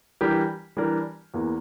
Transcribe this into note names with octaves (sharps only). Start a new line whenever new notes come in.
E3 G3 D4 G4 A#4
E3 G3 D4 G4 A#4
E2 E3 A#3